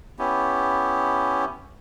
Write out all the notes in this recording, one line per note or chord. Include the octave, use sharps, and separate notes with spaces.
B3 C#4 E4 G4